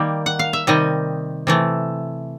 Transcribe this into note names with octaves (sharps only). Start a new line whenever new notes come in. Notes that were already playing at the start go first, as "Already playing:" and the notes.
Already playing: D#3 G3 A#3
F#5
F5
E5
C3 D#3 G3 D#5
C3 E3 A3